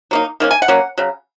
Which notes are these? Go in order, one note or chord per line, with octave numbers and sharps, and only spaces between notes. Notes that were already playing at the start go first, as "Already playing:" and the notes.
F#3 A#3 D#4
D#3 A#3 C#4
G#5
F#5
F#3 A#3 C#4
C#3 F#3